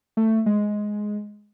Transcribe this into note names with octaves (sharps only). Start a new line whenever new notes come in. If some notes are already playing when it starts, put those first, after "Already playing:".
A3
G#3